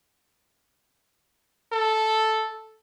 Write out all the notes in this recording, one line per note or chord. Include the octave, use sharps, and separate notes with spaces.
A4